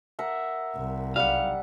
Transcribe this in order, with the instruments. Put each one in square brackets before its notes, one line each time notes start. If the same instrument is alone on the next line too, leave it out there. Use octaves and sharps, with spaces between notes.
[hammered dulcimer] A#4 E5 F#5
[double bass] C2
[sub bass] B1 [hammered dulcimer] G3 F#5 [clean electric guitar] F5